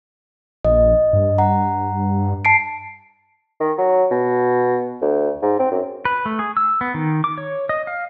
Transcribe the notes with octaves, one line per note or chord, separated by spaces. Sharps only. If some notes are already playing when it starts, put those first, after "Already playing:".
A#1 D#5
G2
F#5 A#5
A5 C7 D7
D#3
F#3
B2
D2
G#2
C4
F#2
B4
A3
G#4
E6
B3
D#3
D6
C#5
D#5
F5